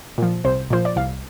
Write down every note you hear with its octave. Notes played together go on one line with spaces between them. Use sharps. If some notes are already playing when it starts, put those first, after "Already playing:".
A#2 F3
C2 C5
A#2 F3 C5
D5
C2 F5